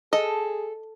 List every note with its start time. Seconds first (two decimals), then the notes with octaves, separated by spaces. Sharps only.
0.13 G#4 A4 D#5